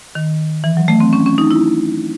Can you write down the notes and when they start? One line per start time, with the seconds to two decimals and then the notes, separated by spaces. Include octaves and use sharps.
0.15 D#3
0.64 E3
0.77 F#3
0.88 A3
1.00 C4
1.13 C#4
1.26 C#4
1.38 D#4
1.51 E4